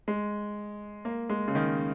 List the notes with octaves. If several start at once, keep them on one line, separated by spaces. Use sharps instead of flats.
G#3
A#3
G#3
C#3
D#3